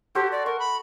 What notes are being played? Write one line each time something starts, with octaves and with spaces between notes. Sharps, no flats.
F#4 G4 A4 C5
D5
A#4 C#6
B5